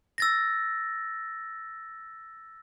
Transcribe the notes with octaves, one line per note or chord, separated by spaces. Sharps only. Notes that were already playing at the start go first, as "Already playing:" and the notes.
E6 A6 A#6